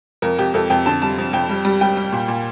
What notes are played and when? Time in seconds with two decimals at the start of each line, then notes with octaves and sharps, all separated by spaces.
0.22 F2 A#4
0.39 F2 G4
0.54 F2 A4
0.70 F2 G5
0.86 D3 A5
1.02 G3 A5
1.18 F2
1.33 F2 G5
1.49 G3
1.65 G3
1.81 G3 G5
1.97 G3
2.12 A#2
2.28 A#2